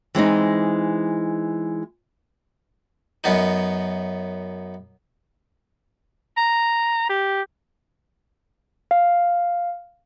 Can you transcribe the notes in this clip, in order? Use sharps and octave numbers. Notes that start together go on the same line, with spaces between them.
E3 G#3 C4 D#4
F#2 B3 D#4
A#5
G4
F5